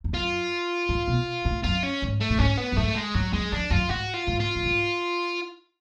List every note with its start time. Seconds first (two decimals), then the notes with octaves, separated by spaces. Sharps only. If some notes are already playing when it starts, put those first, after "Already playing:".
0.04 F2
0.14 F#2 F4
0.89 G#2
1.08 B2
1.45 A2
1.64 F#2 F4
1.83 C#4
2.02 G#2
2.21 A3
2.30 A2
2.39 G#2 C#4
2.58 B3
2.72 F#2
2.76 G#2 A3
2.95 G#3
3.14 G#2 F#3
3.33 F#2 G#3
3.52 F2 D4
3.71 F#2 F4
3.89 G#2 F#4
4.14 F4
4.27 G#2
4.40 F4
4.55 F#2
4.65 G#2